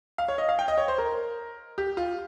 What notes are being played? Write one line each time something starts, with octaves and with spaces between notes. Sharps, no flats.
F5
C#5
D#5
F5
G5
D#5
C#5
C5
A#4
G4
F4